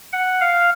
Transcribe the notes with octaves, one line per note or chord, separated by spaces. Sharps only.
F#5
F5